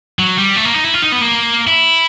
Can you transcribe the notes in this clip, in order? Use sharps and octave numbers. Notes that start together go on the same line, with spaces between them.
F#3
G3
A3
A#3
D#4
E4
F4
D#4
B3
A#3
E4